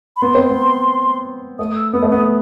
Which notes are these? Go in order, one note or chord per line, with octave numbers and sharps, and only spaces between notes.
B5
B3 C6
C4
B3
A3 D#6
E6
B3 D#6
A3
B3 D#6